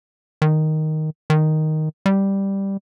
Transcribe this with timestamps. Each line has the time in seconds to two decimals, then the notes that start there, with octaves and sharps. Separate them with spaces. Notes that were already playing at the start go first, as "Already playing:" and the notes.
0.42 D#3
1.30 D#3
2.06 G3